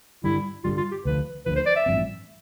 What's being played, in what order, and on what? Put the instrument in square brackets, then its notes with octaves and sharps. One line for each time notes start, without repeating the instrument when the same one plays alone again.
[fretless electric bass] G2 D3 G3 [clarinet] E4
[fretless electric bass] G2 D3 G3 [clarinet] F4
[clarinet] F4
G4
[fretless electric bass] D2 D3 F3 [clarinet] B4
[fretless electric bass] D2 D3 F3 [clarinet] B4
[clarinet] C5
D5
E5
[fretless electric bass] A1 G2 F3 C4